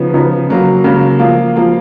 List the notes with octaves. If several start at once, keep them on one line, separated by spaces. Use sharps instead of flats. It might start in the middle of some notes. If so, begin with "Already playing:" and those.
Already playing: C#3 F3 B3 D#4
C#3 F3 B3 D#4
C#3 F#3 A#3
C#3 F#3 A#3
F3 A#3 F4
F3 A#3 F4